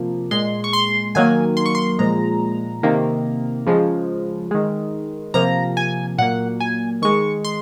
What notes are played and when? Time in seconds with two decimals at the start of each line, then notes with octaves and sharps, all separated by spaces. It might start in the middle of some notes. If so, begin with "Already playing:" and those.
Already playing: C3 F3 A#3
0.31 A#2 G#3 C6
0.64 C#6
0.73 C6
1.15 D#3 F#3 A#3 G#5
1.57 C6
1.66 C#6
1.75 C6
1.99 A#2 F3 G#3 A#5
2.83 C3 D#3 A#3
3.67 C#3 F3 G#3
4.51 D#3 G#3
5.34 C3 F3 A#3 A#5
5.77 G#5
6.18 A#2 F#3 A#3 F#5
6.60 G#5
7.02 D#3 G#3 C#6
7.45 C6